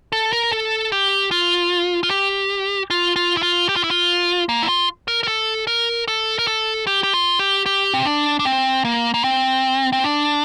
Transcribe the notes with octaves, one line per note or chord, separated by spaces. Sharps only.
A4
A#4
A4
G4
F4
F4
G4
F4
F4
E4
F4
G4
F4
E4
F4
A#3
E4
F4
A#4
A#4
A4
A#4
A4
A#4
A4
G4
G4
F4
G4
G4
C4
D4
D4
C4
A#3
A#3
C4
C4
D4